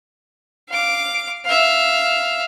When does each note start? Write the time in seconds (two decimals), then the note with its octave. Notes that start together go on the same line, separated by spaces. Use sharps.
0.69 F5 D6
1.45 E5 F5